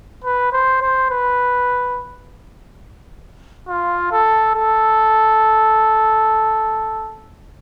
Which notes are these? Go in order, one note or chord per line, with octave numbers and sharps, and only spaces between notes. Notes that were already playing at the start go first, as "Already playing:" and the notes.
B4
C5
C5
B4
F4
A4
A4